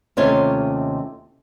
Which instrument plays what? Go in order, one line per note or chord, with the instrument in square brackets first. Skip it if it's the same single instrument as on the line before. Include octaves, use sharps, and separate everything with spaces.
[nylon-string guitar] D#2 C3 A3 C#4 F4 C#5